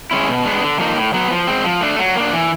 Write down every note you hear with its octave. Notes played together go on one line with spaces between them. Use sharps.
G#3 C#4 E4
B2
G#3 B3 D4
D3
F3 A#3 D#4
A2
F#3 B3
F3
G#3 C4
F3
A3 D4
F#3
A#3 D4
E3